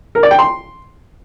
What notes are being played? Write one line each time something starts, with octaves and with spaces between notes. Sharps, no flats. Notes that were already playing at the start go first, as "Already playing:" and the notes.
A#4
D5
G5
C6